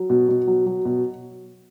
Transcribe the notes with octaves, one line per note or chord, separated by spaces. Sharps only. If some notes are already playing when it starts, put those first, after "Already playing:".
Already playing: F#3
B2
B2
F#3
F#3
B2